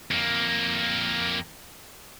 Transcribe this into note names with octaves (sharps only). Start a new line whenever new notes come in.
F2 A#3